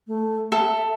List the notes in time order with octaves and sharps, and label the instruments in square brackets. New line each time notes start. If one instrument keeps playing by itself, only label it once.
[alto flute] A3
[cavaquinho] A4 [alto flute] E5